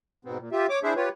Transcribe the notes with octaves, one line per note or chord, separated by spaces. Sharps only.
G#2 B2 B3 C4
A#2
F4 G4 E5
C#5 D6
D4 E4 G#4 C5 E5
F4 G4 B4 C#5